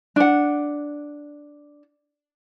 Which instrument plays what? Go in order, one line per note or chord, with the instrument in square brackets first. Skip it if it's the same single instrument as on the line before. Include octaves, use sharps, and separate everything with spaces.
[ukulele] D4 F#5